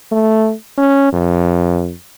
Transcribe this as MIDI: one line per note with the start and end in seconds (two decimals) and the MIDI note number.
0.12 0.53 57
0.78 1.09 61
1.13 1.94 41